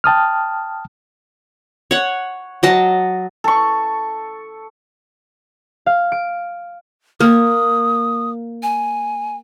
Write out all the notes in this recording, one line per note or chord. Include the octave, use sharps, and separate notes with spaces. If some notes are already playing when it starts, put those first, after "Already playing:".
G5 A5 D#6 F6
C#5 F#5
F#3 D#5 A5
A4 C#6
F5
D7
A#3 D#6
G#5